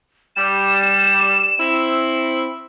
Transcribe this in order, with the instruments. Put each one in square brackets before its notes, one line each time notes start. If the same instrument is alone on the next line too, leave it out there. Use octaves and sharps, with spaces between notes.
[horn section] G3 [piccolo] E7
[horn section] C4 E4